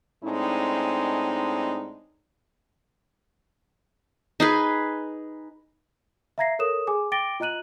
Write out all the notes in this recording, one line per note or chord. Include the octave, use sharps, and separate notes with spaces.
A2 G#3 C4 D4 D#4
D#4 G#4 B4
E5 F5 A#5 G#6 A#6 C7
A4 A#4 C#5 D#6 E7
G#4 G#5 D6
G5 D6 A6 A#6 D7 G7
F4 D#5 A#5 F#6 D#7 F#7